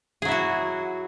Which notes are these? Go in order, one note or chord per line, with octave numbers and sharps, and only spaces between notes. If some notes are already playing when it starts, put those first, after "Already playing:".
F#3 E4 F#4 G#4